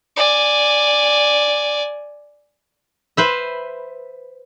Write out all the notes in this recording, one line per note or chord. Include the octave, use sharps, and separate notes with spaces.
D5 G#5
B4 C5 E5